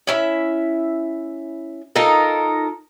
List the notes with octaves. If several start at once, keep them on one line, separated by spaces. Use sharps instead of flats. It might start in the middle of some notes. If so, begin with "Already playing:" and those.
C#4 E4 E5
D#4 F4 A4 A#4